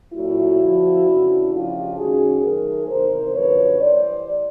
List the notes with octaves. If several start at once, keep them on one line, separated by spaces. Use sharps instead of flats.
A#2 F#3 A3 E4 F#4
F2 D3 F3
C#3 E3 A3 D4
C#3 F3 A3 D4 F4 G4
F#2 D#3 G#3 C#4 F#4 G#4
D#3 F#3 A3 G#4 A#4
E2 C3 D#3 A#4 C5
F#2 D3 F3 A3 B4 C#5
A2 E3 G3 C5 D5